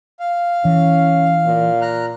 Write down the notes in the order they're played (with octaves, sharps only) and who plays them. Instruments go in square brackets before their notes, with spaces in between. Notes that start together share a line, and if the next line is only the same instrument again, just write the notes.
[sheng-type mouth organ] F5
[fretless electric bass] E3 [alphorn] C#4
[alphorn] A#2
[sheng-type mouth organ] A#5 F6 F#6